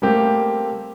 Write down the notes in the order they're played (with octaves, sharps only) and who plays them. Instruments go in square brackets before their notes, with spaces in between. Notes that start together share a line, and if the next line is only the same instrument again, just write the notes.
[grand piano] G3 A3 A#3 C4 G4